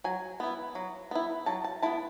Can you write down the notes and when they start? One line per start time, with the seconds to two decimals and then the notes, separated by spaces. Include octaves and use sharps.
0.04 F#3 G#5
0.40 B3 E4
0.75 F#3
1.11 B3 E4
1.46 F#3 A5
1.64 A5
1.82 B3 E4 A5